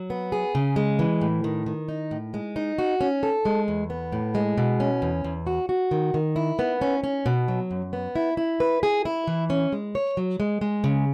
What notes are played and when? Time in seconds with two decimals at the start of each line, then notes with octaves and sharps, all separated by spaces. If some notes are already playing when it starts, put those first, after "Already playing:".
Already playing: F#3
0.10 B3
0.32 G#4
0.55 C#3
0.76 G#3
0.99 E3
1.21 A2
1.44 D#3
1.66 D#3
1.88 D#4
2.11 A2
2.34 G#3
2.56 D#4
2.78 F#4
3.01 C#4
3.23 A4
3.45 G#3
3.68 E2
3.90 B3
4.12 A2
4.35 G#3
4.58 B2
4.80 C#4
5.02 E2
5.24 E2
5.47 F#4
5.69 F#4
5.91 D#3
6.14 D#3
6.36 E4
6.59 B3
6.81 C#4
7.04 C#4
7.26 B2
7.48 F#3
7.71 F#2
7.93 B3
8.16 E4
8.37 E4
8.60 B4
8.83 G#4
9.05 E4
9.27 E3
9.50 C#4
9.72 G#3
9.95 C#5
10.17 F#3
10.40 G#3
10.61 G#3
10.84 C#3